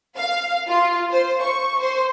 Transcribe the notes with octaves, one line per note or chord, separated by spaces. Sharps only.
F5
F4
C5
C#6
C5